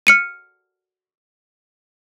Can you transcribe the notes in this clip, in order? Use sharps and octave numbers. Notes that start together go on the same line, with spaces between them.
F6 C#7 D#7